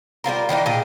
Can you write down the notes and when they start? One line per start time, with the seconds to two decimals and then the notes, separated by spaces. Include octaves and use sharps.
0.24 G3 C4 F4 A#4
0.49 D#3 E3 D4 D#4
0.66 A#2 D#4 G4 G#4